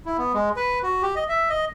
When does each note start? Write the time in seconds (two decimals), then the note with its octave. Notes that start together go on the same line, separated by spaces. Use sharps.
0.05 E4
0.18 B3
0.34 G#3
0.56 B4
0.83 F#4
1.02 G4
1.16 D#5
1.29 E5
1.49 D#5